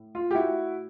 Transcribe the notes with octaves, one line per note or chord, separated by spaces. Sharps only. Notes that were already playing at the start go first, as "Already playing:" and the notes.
Already playing: A2
F4
G4
E4 F#4